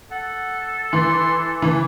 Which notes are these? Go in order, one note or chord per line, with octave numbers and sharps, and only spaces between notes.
A4 F#5
E3 C6
C#3 E3 D4